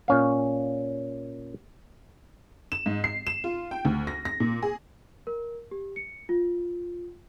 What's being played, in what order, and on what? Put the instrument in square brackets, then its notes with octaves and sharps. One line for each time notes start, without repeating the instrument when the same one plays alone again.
[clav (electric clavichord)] A#2 C#4 F5
[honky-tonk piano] E7
G#2
C7
E7
F4
G5
D2
A#6
A#6
A#2
G#4
[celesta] A#4
G4
C#7
F4